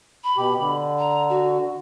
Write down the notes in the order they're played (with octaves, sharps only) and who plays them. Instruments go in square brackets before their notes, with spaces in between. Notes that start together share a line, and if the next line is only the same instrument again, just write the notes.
[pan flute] B5
[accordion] B2 G4
D3
[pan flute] A#5
F#4